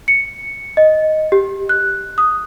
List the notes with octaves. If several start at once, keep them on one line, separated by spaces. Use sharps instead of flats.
C#7
D#5
G4
F#6
D#6